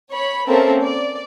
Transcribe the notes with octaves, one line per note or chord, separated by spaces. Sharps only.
C#5 B5
A#3 C4 C#4 A4 A#4 E5
D5